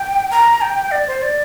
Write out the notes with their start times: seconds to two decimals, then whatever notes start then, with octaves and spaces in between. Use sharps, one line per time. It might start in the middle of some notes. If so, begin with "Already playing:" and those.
Already playing: G5
0.31 A#5
0.61 G5
0.91 D5
1.08 C5
1.22 D5